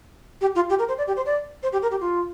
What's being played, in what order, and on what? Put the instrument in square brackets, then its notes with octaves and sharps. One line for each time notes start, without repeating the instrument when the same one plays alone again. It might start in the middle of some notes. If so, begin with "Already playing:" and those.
[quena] G4
F4
G4
A#4
C5
D5
G4
C5
D5
C5
G4
A#4
G4
F4